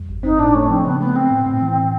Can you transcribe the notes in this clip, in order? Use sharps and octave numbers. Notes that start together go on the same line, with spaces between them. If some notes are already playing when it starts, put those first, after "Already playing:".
Already playing: F2 G3
G1
C4 D#4
A2 D4
A3 C#4
F3 C4
C#3 B3
A3 B3
B3 C4
A2
A2
E3